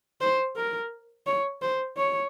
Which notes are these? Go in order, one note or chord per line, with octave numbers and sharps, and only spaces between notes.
C5
A#4
C#5
C5
C#5